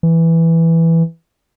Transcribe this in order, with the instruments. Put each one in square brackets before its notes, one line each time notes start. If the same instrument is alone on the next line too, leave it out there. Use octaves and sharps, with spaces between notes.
[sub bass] E3